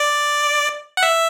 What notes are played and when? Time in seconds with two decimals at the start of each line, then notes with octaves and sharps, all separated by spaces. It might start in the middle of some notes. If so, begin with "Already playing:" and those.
Already playing: D5
0.97 F#5
1.03 E5